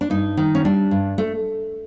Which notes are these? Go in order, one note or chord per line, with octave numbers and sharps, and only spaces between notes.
D4
G2 D#4
D#3
C#4
G3 D4
G2
A3